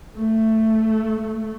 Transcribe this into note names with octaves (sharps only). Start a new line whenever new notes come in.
A3